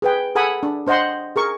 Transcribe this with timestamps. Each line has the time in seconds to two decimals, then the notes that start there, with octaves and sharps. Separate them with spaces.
0.02 G#4 B4 G5
0.35 G#4 A4 F#5 G#5 B5 D#6
0.63 D4
0.86 D4 C5 D#5 F#5 C6
1.36 G#4 A#4 C#6